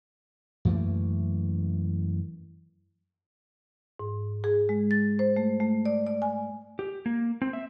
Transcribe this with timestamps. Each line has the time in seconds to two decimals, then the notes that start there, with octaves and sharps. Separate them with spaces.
0.65 F#2 E3 A3 A#3
4.00 G#2
4.44 G#4
4.69 G#3
4.91 A6
5.19 C5
5.37 A3
5.60 A3
5.86 D5
6.07 D5
6.22 G#5
6.79 G4
7.06 A#3
7.42 C4
7.53 E5